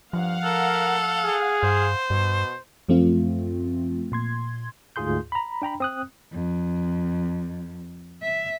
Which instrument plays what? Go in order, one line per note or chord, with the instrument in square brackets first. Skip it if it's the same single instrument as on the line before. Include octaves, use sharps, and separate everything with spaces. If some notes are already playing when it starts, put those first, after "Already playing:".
[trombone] G2 [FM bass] F3 [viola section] F5 F#5
[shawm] A4 [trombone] A#4
[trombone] G#4
[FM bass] G2 [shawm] C5
[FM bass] G2 [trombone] B2
[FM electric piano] F#2 F3 A3 C4 F4
A#2 C6 G#6
[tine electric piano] D2 G#2 F4 G#4 C6 G6
A#5 B5
D4 G5 A#5 B5
C4 D#6 F#6
[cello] F2
E5